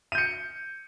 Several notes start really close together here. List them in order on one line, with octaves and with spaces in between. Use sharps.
D#7 G6 C#7